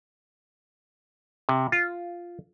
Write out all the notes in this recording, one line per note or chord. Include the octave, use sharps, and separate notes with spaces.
C3
F4